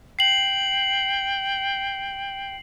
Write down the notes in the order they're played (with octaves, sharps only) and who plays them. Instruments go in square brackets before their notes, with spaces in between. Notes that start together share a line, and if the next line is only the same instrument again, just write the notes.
[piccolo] G5 [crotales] C7 F#7